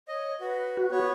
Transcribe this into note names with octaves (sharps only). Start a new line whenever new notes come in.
C#5 D#5
F#4 B4
F#4
B3 C#5